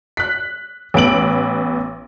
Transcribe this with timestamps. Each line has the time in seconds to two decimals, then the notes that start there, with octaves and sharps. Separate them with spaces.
0.17 F#6 B6
0.94 A1 B3 D7 F#7